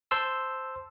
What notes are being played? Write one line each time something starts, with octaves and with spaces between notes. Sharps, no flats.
C5 A5 C6 E6